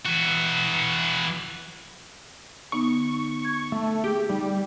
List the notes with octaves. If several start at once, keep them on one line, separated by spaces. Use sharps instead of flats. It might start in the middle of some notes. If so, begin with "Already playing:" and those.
E3 F#4
D3 B3 D#4 C#6
G#6
A3
G4 G#4
G3 D#4 G5